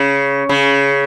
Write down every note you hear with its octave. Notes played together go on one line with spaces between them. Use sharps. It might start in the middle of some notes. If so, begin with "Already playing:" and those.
Already playing: C#3
C#3